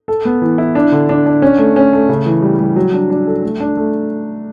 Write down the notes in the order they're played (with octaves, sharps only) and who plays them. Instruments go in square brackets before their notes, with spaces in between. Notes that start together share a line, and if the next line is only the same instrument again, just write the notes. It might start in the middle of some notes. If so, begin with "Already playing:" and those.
[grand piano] A4
B3
E3
E4
D4
D3
D4
D4
C#4
A3
C#4
A3
C#3
E3
G3
G3
F#3
D4
D4
A4
A3
D4
A3